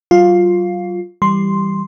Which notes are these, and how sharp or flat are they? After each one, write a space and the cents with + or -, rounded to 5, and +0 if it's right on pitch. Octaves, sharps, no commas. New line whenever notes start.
F#3 +40 F4 +10
E3 +0 G3 +0 C6 +0